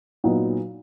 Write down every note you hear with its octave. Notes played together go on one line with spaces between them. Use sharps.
A#2 F#3 B3 D#4